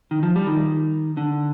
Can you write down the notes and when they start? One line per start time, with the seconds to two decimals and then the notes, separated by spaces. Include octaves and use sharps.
0.11 D#3
0.23 F3
0.36 G3
0.47 D#3
1.17 D3